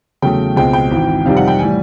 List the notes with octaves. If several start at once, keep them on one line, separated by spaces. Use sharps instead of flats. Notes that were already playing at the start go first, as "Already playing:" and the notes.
E2 C#3 F#3 A3 G5
C#2 B2 G#3 C4 G5
G5
G#1 G#2 E3
F2 C3 D#3 G3 F5
F#5
G5
A2 E3 G3 G#5